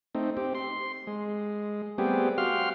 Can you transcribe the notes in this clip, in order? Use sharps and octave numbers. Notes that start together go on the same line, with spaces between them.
A3 C4 D#4
C4 G4
C6
G#3
G3 A3 B3 C4 G4 G#4
F#4 G4 F5 C6 F6